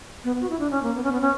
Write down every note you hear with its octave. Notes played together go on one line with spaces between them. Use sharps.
B3
F#4
E4
D4
C#4
A#3
B3
C#4
B3
C#4